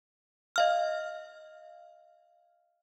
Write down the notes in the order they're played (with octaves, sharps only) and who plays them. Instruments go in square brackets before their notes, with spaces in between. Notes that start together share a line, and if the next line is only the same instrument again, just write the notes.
[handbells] D#5 F5 F6